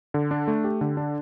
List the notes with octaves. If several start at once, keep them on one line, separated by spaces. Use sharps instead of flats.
D3
D4
A3
G4
D3
D4